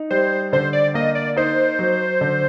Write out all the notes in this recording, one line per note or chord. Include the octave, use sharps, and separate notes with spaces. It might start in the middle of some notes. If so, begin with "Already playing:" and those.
Already playing: D#4
G3 C5
D3 C5
D5
A#3 D#5
D5
D#4 C5
F#3
D3